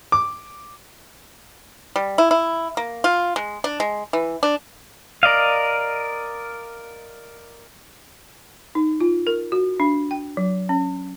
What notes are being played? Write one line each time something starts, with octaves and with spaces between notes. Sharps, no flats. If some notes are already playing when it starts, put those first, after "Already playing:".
D6
G3
E4
E4
A#3
F4
G#3
D4
G#3
E3
D4
A#4 D5 D#5 F5
D#4
F4
A#4
F#4
D4
G5
F#3
C#4